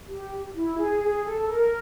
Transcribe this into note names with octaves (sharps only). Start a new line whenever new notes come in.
G4
E4
G#4
G#4
A4
A#4